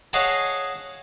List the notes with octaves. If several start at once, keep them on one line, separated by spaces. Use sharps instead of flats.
G#4 C#5 D#5 F5 F#5 A5